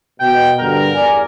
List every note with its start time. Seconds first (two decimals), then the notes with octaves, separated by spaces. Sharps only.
0.20 B2 G5
0.60 G2 D3 A#4
0.94 E2 D5 G#5